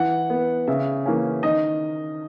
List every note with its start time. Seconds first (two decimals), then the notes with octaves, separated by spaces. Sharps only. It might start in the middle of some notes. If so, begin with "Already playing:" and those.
Already playing: E3 F#5
0.30 B3
0.67 C#3 E5
1.05 E3 A#3 C#4
1.43 D#3 D#5